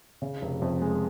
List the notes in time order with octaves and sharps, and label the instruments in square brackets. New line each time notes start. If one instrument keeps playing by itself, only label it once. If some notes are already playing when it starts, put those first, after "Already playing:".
[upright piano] C#3
F1
F2
G#3